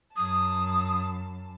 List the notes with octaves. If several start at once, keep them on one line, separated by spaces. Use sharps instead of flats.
F#2 A5 D#6